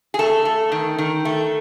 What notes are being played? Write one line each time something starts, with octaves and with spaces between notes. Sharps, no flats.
G#4
A3 A4
A3
D#3
D#3
A3